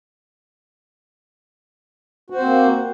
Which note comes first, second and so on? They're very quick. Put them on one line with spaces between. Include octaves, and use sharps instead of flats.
F#4 C5 C4 A#3